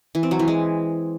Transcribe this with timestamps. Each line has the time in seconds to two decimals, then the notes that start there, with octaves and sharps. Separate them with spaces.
0.15 E3
0.23 C4
0.31 F#3
0.39 E3
0.48 G#3